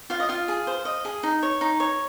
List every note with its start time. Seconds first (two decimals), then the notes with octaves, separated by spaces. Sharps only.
0.10 F4 F5
0.20 D#5
0.29 F4 F5
0.48 G#4
0.67 C5
0.85 D#5
1.05 G#4
1.23 D#4
1.43 C#5
1.61 D#4
1.80 C#5